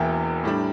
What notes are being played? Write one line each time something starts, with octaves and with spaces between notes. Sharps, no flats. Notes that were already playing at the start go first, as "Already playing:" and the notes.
Already playing: E1 E2 E3 A#3 E4 G5
A2 G3 D4